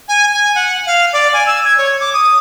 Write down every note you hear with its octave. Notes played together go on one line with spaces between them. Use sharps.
G#5
G#5
F#5
F5
D5
G#5
E6
G#6
C#5
D6
D#6